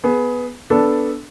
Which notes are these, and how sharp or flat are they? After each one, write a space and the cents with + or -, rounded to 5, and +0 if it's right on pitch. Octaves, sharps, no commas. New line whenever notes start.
B3 +0 G#4 +20
B3 +0 D4 -10 A4 +0